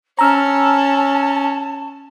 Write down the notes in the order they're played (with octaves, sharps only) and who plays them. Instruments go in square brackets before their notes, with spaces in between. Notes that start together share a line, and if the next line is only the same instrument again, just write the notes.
[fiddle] C#4 [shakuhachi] A5 [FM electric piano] A#5 E6 F6